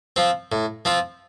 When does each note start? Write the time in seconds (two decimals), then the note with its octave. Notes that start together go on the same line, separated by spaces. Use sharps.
0.16 F3 C4
0.52 A2
0.85 F3 C4 F4